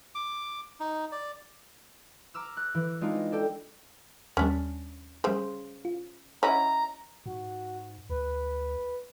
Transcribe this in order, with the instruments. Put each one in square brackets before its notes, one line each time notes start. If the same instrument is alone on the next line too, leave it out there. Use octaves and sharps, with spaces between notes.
[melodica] D6
D#4
D5
[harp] A#5 D6 E6 F6
F#6
E3
G#3 C4 D4 D#4 F4
A4 D5 G5
[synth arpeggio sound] D#2 G3 [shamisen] C#4 D4
[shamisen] C#3 C5 [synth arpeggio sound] G3 G#4
[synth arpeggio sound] F4
[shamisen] C#4 E4 [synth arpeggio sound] C#5 D#5 F#5 [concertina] A#5
[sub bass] G#2 [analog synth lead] F#4
[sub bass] D2 [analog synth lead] B4